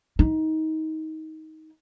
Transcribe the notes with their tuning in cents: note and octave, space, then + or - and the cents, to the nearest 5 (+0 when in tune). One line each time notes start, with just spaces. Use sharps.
D#4 +20